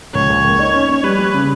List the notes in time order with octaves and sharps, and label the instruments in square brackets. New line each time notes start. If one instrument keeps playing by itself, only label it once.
[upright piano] C#2 [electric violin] C#5
[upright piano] C#2
A#3
D#4
C#4
C#4
[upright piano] G3 [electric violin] B4
[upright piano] G3
C#3